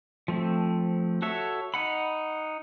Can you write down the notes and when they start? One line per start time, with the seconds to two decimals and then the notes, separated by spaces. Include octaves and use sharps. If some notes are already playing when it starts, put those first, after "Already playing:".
0.28 F3 A3 C4
1.22 F#4 A4 C#5 E5
1.74 D#4 F#5 B5